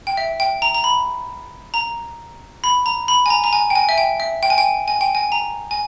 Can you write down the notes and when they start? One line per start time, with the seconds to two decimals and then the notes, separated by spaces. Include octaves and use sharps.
0.07 G5
0.17 E5
0.40 G5
0.62 A#5
0.74 A#5
0.84 B5
1.74 A#5
2.64 B5
2.86 A#5
3.08 B5
3.26 G#5
3.30 A#5
3.44 A#5
3.53 G#5
3.70 G5
3.75 G#5
3.89 E5
3.98 G5
4.20 E5
4.43 G5
4.50 G#5
4.58 G5
4.88 G#5
5.01 G5
5.15 G#5
5.32 A#5
5.71 G#5